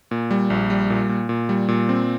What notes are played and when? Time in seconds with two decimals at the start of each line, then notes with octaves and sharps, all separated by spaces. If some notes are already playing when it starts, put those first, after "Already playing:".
0.11 A#2
0.31 G3
0.50 A#1
0.70 G3
0.90 A#2
1.09 A#2
1.29 A#2
1.49 G3
1.68 A#2
1.89 C4